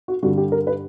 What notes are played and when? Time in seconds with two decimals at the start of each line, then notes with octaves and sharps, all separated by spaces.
0.08 F#4
0.23 G2 D3 G3 F#4
0.38 G4
0.52 A#4
0.67 B4